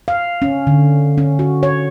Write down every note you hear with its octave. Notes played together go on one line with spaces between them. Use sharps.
F5
C#4
D3
C#4
F#4
C#5